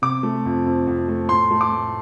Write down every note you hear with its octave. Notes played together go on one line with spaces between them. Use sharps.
C3 D6
A3
F2
F2
F2
A3
A2 C6
A3
D6
A2